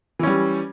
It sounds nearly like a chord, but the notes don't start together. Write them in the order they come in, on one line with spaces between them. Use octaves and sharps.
E3 C#4 G3